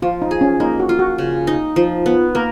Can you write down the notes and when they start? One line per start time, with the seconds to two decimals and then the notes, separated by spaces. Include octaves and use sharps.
0.02 F3 F4
0.22 D#4
0.31 G#4
0.41 C#4
0.60 A#3 D#4
0.80 F#4
0.89 F4
0.99 F#4
1.18 C#3
1.47 D#4
1.76 F3
2.06 B3
2.35 A#3 A#4